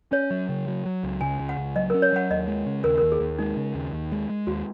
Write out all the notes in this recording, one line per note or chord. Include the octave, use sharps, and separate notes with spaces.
C#4 C#5
F#3
C#3
F#3
F#3
C#2
C#3 G#5
C#2
F#5
C#2
F#3 D#5
A#4
C#4
C#5
F#3 F#5
D#2 D#5
G#3
C#3
D#2 A#4
A#4
D#2
G#4
D#2
G#3 D#4
C#3
D#2
D#2
G#3
G#3
D#2 F#4